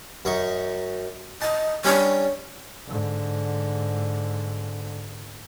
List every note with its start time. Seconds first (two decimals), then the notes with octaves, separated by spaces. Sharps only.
0.25 F#2 D#4 C#6
1.42 D#5 A5
1.85 G3 C#4 D4 C#5
2.87 G#2 D3